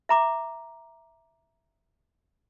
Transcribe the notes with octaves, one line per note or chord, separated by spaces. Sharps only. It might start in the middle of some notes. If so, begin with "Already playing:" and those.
E5 A#5 D6